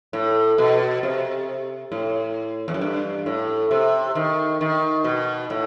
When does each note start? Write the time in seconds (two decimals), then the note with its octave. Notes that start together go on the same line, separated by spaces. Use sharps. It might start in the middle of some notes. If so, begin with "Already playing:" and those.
0.13 A2
0.58 B2
1.03 C3
1.92 A2
2.68 E2
2.74 F#2
2.81 G2
3.26 A2
3.71 C3
4.15 D#3
4.61 D#3
5.04 B2
5.50 A2